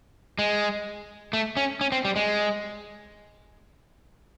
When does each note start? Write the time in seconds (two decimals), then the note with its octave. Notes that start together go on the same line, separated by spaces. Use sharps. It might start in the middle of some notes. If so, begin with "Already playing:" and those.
0.39 G#3
1.33 A3
1.57 C#4
1.81 C#4
1.92 C4
2.05 G3
2.16 G#3